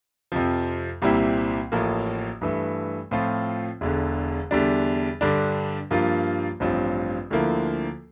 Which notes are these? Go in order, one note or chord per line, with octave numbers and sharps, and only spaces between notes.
F2 C3 F3
C2 A#2 G3 C4 E4
A1 A2 F3 A#3
G2 E3 A3
A2 F3 C4 F4
E1 E2 D3
E2 D3 G3 D4
G2 D3 G3 D4
G2 F3 A#3 F4
A1 G2 F3 C4 F4
D2 D3 F3 A#3 E4